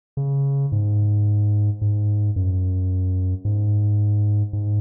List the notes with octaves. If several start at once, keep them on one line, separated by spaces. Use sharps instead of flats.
C#3
G#2
G#2
F#2
G#2
G#2